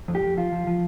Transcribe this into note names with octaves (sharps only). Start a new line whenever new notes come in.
F2
G4
F2
F3 F4
F3
F3